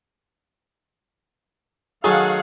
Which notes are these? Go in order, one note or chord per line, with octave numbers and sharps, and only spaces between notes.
D#3 F#3 A3 G#4 F5 F#5